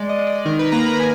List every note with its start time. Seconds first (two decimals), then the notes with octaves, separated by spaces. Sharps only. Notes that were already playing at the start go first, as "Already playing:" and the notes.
Already playing: G#3 D5
0.09 D#5
0.19 G#3
0.27 D5
0.45 D#3 A#4
0.59 B4
0.72 A#3 A#5
0.86 B5
1.00 G#5